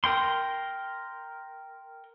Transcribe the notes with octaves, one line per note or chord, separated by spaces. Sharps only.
A#4 G5 C6